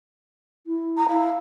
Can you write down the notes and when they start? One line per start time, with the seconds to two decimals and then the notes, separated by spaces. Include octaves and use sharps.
0.67 E4
0.97 A#5
1.08 E4 F5